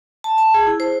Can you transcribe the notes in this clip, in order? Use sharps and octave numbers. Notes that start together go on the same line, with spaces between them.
A5
A5
G#4
E4
C5